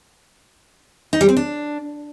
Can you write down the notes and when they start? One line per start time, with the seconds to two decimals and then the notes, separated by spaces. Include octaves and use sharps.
1.13 D#4
1.21 G3
1.29 C4
1.37 D4